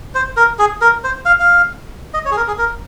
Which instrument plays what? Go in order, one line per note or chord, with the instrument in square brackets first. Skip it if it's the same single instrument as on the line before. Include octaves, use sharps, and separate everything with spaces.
[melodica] C5
A#4
G#4
A#4
C5
F5
F5
D#5
C#5
G#4
A#4
G#4
A#4